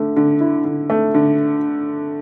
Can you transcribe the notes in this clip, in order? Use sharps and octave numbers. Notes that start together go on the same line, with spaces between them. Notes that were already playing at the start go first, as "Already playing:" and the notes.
Already playing: D3 A3
D3
E4
D3
A3
D3